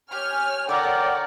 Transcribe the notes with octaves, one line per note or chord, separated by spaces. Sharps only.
G4 C#5 G#5 F6
D3 A#4 C#5 D5 E5 F#5 G5 D6